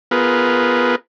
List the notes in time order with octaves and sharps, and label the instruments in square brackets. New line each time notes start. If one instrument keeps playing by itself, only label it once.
[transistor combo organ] B3 F4 G#4 A#4 B4